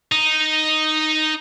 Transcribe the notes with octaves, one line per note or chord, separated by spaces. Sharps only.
D#4